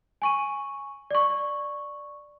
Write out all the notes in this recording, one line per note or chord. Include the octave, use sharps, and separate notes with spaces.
G#5 C#6 D#7
D5 C#6